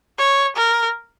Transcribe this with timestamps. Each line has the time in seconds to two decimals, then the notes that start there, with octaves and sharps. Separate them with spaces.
0.18 C#5
0.57 A#4